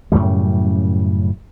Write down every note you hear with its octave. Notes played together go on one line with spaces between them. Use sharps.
F#2 A2 C#3 G3